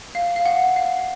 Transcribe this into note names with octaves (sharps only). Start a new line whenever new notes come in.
F5
F5
F#5
F5